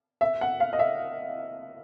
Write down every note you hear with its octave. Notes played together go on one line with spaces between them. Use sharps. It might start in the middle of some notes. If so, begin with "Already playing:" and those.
E5
F#5
F5
D#5
E5